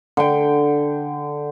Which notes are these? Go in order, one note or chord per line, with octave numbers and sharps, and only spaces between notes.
D3 G5